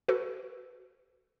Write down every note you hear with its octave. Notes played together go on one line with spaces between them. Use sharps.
F#4 A4 B4